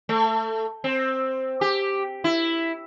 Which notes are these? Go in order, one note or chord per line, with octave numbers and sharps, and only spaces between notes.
A3
C4
G4
E4